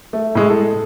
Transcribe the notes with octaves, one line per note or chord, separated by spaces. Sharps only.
A3
A2 G#3 E4
A4